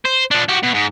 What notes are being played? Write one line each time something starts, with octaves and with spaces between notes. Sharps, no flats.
C5
F3 D4
F#4 G4
B2
G#2